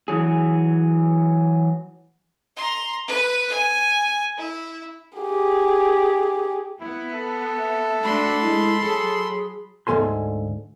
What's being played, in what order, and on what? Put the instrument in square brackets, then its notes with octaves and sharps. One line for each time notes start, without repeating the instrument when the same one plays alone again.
[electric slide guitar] E3 F#3 G#4
[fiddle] A#5 C6
B4
G#5
E4
[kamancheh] G4 G#4
[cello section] B3 [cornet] E4
[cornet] A4
[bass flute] E5
[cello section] A3 D4 F#4 [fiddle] B5 C6
[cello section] G#3 [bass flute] E4
[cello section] F#3 [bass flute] G#4 [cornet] A4
[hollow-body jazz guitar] D2 G#2 F3 A4 G#5 C6